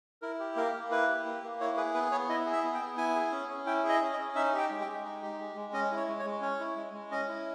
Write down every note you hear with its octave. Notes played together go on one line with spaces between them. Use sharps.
E4 A#4
G4
A#3 A#4
A#3
E4 B4
G4
A#3
A#3
E4 C#5
G#4 B4
B3 B4
B3 C#5
E4 D#5
G#4
E5
B3
G5
B3
E4 G#5
G#4
C#4
C#4
E4 G5
G#4
D#5
C#4
D#5
C#4
D#4 E5
G4 G5
G#3
G5
G#3
D#4
G4
G#3
G#3
C#4 D#5
E4
C#5
G#3
C#5
G#3
C#4 C#5
E4
G#3
G#3
C#4 D#5
E4